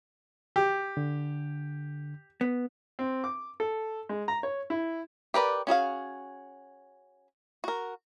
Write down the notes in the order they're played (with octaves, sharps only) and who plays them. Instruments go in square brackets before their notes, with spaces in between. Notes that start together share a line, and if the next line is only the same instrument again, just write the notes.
[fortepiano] G4
[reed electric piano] D3
[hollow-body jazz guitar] B3
[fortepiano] C4
D6
A4
G#3
A#5
C#5
E4
[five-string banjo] G4 A#4 B4 D5
C#4 F#4 G#4 F5
F#4 A#4